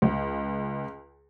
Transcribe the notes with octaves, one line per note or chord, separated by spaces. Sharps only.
C#2